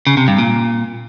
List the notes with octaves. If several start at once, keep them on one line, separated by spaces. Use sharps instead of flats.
C#3
C3
G2
A#2